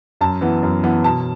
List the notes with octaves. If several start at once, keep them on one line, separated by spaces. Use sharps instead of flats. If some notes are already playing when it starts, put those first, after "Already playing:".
F#2 A5
E3 B3
F#2
E3 B3
B2 A5